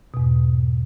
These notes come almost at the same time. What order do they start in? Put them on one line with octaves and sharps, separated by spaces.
B2 E2 G#2